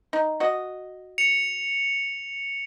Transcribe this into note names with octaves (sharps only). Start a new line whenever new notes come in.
D#4
F#4 D#5
C#7 F7